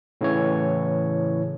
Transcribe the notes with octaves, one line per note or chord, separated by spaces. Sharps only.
A2 C#3 E3 C#4 C#5